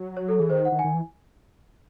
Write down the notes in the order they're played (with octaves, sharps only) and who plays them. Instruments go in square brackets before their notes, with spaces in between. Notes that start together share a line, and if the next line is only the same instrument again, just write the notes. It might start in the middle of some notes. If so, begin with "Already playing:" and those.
Already playing: [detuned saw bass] F#3
[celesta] C#5
A4
[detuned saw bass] E3 [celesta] G#4
[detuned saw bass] D#3 [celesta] C5
[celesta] F#5
[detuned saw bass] D#3
[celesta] G#5
[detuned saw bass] D#3
E3